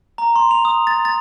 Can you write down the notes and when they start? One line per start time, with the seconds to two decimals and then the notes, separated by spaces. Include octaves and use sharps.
0.18 A#5
0.36 C6
0.51 F7
0.65 D#6
0.87 A6
1.05 A6